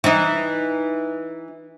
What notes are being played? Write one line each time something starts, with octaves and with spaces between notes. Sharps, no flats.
E3 D#4